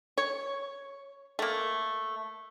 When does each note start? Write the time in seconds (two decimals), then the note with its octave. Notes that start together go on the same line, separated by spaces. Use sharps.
0.18 C#5
1.39 A3 A#3